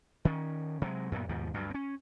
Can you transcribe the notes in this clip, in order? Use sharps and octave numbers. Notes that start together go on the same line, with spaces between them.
D#3 C#4
C3 F#3 G#3
F#2 A#2 G#3 B3
D#2 G#2 B2 F3
D2 G2 F#3
C4 C#4